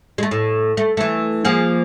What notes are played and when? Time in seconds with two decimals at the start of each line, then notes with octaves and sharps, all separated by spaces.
0.18 G#3 A3
0.31 A2
0.77 A3
0.97 E3 A3
1.45 F3 A#3 G#4